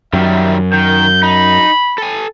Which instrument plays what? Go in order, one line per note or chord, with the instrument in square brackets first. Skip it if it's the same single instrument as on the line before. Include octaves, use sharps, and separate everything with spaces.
[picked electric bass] F#2 [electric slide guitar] D#3 G3 [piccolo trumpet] E5
[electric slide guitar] D#3 [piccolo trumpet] G6
[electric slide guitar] D#4 [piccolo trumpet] B5
[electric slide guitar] A4 G#5